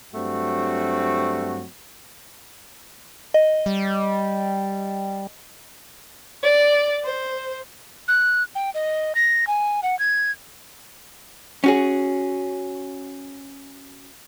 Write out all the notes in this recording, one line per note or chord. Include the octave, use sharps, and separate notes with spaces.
G2 F#3 A3 C4 F#4
D#5
G3
D5
C5
F#6
G5
D#5
A#6
G#5
F#5
G#6
C#4 F#4 G#4